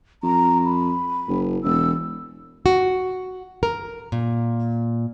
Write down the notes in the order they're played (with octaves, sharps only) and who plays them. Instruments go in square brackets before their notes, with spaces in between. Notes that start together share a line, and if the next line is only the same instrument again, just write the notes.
[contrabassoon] F2 [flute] A#5
[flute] B5
[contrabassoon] F#1
[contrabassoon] E1 [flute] E6
[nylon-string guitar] F#4
A#4
A#2